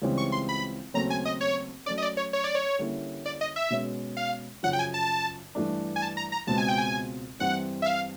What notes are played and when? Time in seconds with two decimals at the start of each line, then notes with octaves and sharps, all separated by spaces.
0.02 C#2 C#3 E3 G3 C4
0.18 C#6
0.32 C6
0.49 B5
0.94 D#2 C#3 F#3 A3 C4 A#5
1.10 G#5
1.25 D#5
1.41 C#5
1.86 F#3 A3 C#4 D5
1.98 D#5
2.02 D5
2.17 C#5
2.33 C#5
2.44 D5
2.55 C#5
2.79 D3 G3 A#3 C#4 E4
3.26 D5
3.41 D#5
3.56 E5
3.70 B2 G#3 C#4
4.17 F5
4.63 F#2 C#3 F3 F#5
4.73 G5
4.79 G#5
4.94 A5
5.55 G2 E3 A3 D4
5.96 G#5
6.02 A5
6.17 A#5
6.32 A#5
6.47 C#2 B2 G#3 C4 A5
6.58 G#5
6.68 G5
6.78 G#5
7.39 G2 E3 G3 C4 E4 F#5
7.82 E5
7.86 F5